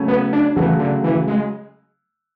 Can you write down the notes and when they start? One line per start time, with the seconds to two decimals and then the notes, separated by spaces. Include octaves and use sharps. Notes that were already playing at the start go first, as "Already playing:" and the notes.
Already playing: C#3 F#3 A3 C#4 F#4
0.08 B3
0.33 D4
0.56 C#3 E3 F#3 A3 C#4 F#4
0.79 D3
1.04 E3
1.28 G#3